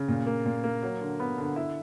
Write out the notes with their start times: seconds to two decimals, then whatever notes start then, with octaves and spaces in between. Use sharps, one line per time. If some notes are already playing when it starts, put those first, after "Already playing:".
Already playing: C#3
0.08 A#2
0.27 A#3
0.46 A#2
0.64 A#3
0.83 F#3
1.01 D3
1.20 B3
1.38 D3
1.56 E4